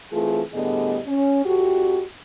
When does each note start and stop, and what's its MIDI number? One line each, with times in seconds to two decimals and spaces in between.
0.12 0.41 52
0.12 0.41 57
0.12 0.41 60
0.12 0.41 65
0.12 0.41 68
0.52 0.98 45
0.52 0.98 50
0.52 0.98 55
0.52 0.98 59
0.52 0.98 68
0.52 0.98 75
1.06 1.42 61
1.45 2.03 41
1.45 2.03 66
1.45 2.03 67